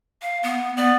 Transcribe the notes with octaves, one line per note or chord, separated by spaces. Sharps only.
F5
B3
B3 D5